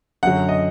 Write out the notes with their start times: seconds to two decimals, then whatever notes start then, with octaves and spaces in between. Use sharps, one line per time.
0.23 F#2 D3 F#3 F#5
0.49 D#5